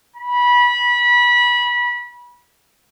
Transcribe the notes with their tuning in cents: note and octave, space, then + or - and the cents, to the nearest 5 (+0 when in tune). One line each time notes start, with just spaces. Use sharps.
B5 -25